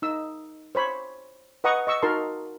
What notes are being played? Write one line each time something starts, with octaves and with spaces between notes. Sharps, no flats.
D#4 E6
C5 C#5 B5
B4 D#5 F#5 A#5 C#6 D#6
D#5 C#6 E6
D#4 F#4 A#4 A5 C6